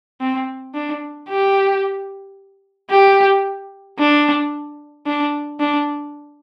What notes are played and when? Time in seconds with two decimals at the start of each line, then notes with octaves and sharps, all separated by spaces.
0.20 C4
0.75 D4
1.29 G4
2.90 G4
3.98 D4
5.06 D4
5.60 D4